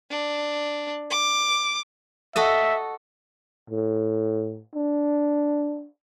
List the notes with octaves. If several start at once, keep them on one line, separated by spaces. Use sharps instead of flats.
D4
D6
F#4 A4 D#5 E5
A2
D4